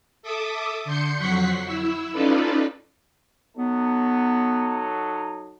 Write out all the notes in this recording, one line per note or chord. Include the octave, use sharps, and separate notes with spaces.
A4 E5 D6 D#6
D3 C6 G6 C#7
F2 F#3 F#5 C#6 B6 C7
E4 E5
C#4 D#4 F4 A4 B4 D5
F#3 B3 D#4 A4